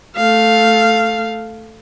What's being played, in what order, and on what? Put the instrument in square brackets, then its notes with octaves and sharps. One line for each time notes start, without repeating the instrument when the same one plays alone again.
[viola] A3 F5